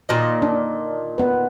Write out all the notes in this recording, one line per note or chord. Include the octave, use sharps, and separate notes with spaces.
A#2 D#3 D#5
D4
B3 B4